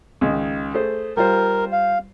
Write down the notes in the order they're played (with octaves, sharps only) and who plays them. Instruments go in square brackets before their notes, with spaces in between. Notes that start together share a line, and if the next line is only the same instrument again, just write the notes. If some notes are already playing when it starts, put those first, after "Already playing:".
[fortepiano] C#2 D#3
A3 G#4 C5
[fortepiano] G3 F4 C5 [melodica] A#4
[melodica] F5